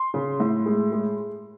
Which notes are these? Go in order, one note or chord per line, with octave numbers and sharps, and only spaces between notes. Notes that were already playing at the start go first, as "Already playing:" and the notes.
Already playing: C6
C#3
A2
G#3
G#3